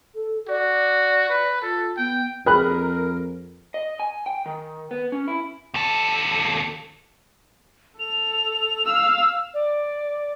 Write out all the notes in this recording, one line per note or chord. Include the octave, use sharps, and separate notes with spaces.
A4
F#4 D5
B4
F4 A4
B3 G5
F2 G#4 A#4 B5 F#6
D#5
G#5
G5
D#3
B3
C#4
E4
D#2 A4
A4 F7
F5 E6
D5